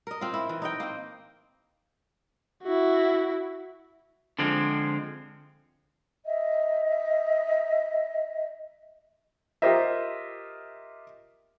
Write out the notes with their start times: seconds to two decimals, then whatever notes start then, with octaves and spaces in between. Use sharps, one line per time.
0.07 A#4 D#5
0.21 C4 F4
0.34 E4
0.49 E3
0.62 D#4 D#5 G5
0.80 A#3 C4
2.63 E4 F#4
4.39 D3 F3 G#3 C4
6.25 D#5 E5
9.62 F4 G4 A#4 C5 D#5 E5